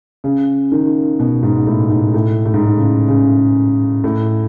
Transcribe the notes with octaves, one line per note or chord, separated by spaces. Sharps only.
C#3
D#3
B2
G#2
A2
G#2
A2
A2
G#2
A2
C#3
C#3
A2